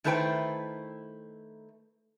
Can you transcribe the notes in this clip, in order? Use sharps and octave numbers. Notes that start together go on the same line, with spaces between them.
D#3 A3 E4 B4 C5 G5